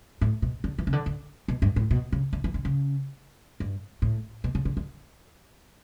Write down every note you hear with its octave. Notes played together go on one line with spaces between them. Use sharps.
A2
B2
D3
E3
C#3
D3
D3
B2
G2
A2
B2
C#3
D3
E3
D3
C#3
G2
A2
B2
C#3
D3
D3